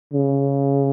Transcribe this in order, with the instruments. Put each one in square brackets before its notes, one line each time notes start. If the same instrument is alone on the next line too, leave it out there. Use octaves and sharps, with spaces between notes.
[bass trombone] C#3